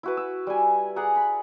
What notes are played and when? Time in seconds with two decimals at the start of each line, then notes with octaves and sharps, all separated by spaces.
0.03 E4 F#4 B4
0.17 E6
0.47 G3 G#5
0.96 G#4 D5 F#5 A#5
1.16 B5